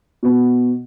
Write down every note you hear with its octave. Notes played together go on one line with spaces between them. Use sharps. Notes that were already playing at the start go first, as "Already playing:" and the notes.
B2 B3